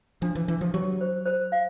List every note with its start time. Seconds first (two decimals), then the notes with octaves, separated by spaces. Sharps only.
0.22 F3 D4
0.35 E3
0.48 E3 D4
0.61 F3
0.74 F#3 G4
1.01 C5
1.26 C5
1.52 F5